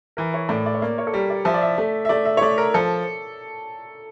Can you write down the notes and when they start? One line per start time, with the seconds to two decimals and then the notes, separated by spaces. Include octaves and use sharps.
0.17 E3 A#4
0.34 C#5
0.49 A2 D5
0.66 D5
0.74 C#5
0.82 A#3 D5
0.98 C#5
1.07 A4
1.13 G3 A#4
1.30 D5
1.45 F3 E5
1.54 D5
1.62 E5
1.78 A3
2.05 E5
2.09 A3 D5
2.25 E5
2.37 C#5
2.41 A3 D5
2.58 A#4
2.74 F3 A4